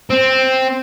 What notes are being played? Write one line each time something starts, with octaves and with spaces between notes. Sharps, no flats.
C4